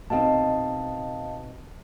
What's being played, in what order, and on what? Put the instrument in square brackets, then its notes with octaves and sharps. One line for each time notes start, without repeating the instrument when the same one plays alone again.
[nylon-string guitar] B2 C4 D#4 [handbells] D#5 F5 A5